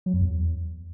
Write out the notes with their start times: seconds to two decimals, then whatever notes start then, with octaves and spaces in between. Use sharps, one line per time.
0.06 F#3
0.14 F2
0.21 E2